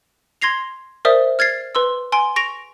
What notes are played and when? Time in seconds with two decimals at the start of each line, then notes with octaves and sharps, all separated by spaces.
0.42 C6 G#6 A#6 C7 F7
1.05 A#4 C5 D5 E5 D#6
1.39 F6 G#6 A6 C7
1.75 B4 C6 E6
2.12 G#5 C6 D7
2.36 C#6 A#6 D7 F7